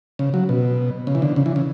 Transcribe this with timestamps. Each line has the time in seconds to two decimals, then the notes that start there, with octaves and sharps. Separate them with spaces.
0.19 C#3
0.34 F#3
0.49 B2
1.07 C#3
1.15 E3
1.22 D3
1.36 C#3
1.46 E3
1.56 C#3